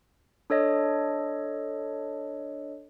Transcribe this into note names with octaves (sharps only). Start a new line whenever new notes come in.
D4 A4 C#5 D#5